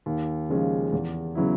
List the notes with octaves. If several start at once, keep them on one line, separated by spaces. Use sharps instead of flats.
D#2
C#3 F3 G#3 C#4
E2
C#3 F#3 B3 E4